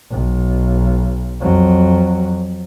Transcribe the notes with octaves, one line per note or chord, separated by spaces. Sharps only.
B1
F2 F#3